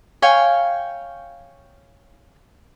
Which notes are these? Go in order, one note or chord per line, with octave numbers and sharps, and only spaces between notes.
C#5 F5 G5 G#5